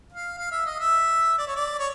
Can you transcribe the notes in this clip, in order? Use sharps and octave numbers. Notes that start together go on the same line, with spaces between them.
F5
F5
E5
D#5
E5
D5
C#5
D5
C#5